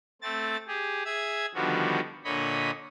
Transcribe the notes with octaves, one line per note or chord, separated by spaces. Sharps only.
A3 C4 A6
G4 G#4
G#4 E5 G#6
D3 D#3 F3 G3 B3 F#4
A#2 D3 C#5 D#5 B5